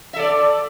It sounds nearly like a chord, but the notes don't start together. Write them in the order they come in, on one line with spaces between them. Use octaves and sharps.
E5 A4 D5